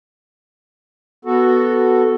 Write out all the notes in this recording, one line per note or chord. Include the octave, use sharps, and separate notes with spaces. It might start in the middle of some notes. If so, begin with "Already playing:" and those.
B3 F#4 A4